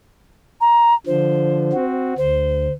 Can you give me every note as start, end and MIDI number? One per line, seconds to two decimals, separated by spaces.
0.61 0.94 82
1.07 1.72 50
1.07 1.72 53
1.07 1.90 72
1.73 2.14 60
1.73 2.14 66
2.18 2.67 38
2.18 2.73 72